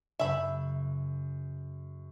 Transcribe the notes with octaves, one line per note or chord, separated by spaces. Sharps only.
F#2 C#3 E5 B5